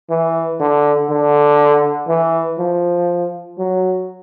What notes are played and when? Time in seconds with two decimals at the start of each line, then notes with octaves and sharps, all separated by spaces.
0.10 E3
0.60 D3
1.10 D3
2.08 E3
2.59 F3
3.58 F#3